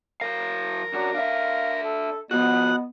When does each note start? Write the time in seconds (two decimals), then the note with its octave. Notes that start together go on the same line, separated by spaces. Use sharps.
0.21 F#3 A#4 F5
0.94 F#2 D4 F#4
1.15 D4 E5 F5
1.83 A4
2.31 F3 B3 F#4 D#5 F#5